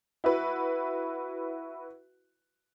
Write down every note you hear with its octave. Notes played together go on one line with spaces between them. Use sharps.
E4 F#4 B4